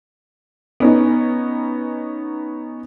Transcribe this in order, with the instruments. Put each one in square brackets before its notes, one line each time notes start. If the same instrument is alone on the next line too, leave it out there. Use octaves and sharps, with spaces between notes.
[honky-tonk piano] B3 C#4 D#4